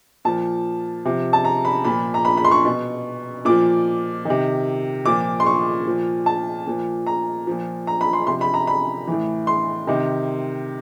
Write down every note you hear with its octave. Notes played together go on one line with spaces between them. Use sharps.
A#2 F3 A5
C3 F3
A5
A#5
B5
A#2 F3 B5
A#5
B5
B5
C6
C#6
B2
A#2 F3 D6
C3 D#3
A#2 F3 D6
C6
C#6
A#2 F3
A5
A#2 F3
A#5
A#2 F3
A#5
B5
C6
C3 F3 C6
B5
A#5
B5
A2 E3
C6
C3 D#3